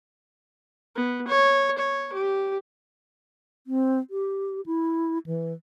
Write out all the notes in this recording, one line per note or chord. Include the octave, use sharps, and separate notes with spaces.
B3
C#5
C#5
G4
C4
G4
E4
E3